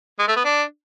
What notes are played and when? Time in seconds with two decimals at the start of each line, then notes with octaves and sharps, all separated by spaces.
0.19 G#3
0.28 A3
0.36 B3
0.45 D4